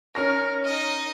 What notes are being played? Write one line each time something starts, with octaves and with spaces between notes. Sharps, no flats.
C#4 D#4 A#4 F6 A#6
D#4 D#5